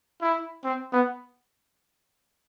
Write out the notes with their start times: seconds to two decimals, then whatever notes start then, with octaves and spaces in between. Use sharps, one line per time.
0.21 E4
0.64 C4
0.92 B3